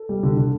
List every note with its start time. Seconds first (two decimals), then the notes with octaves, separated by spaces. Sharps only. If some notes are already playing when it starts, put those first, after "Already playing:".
Already playing: A4
0.09 G3
0.23 D3
0.37 D3